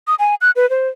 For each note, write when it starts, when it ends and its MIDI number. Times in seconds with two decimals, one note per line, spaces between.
0.07 0.15 87
0.19 0.35 80
0.41 0.51 90
0.56 0.69 71
0.70 0.88 72